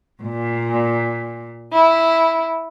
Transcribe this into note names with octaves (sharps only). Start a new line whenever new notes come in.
A#2
E4